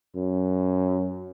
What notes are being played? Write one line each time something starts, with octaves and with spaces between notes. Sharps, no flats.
F#2